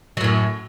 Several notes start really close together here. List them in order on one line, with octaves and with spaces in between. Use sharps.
F#3 A2 F#2